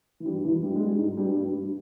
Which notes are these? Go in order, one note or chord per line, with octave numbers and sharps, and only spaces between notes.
E3
G2 G3
E2 E3
G2 G3
G#3
G2 G3
G#2 G#3
G2 G3
G2 G3
G2 G3